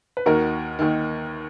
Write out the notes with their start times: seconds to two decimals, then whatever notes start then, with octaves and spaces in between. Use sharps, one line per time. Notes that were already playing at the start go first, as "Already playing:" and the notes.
0.17 B4
0.26 D#2 D#3 F#4 A#4
0.79 D#2 D#3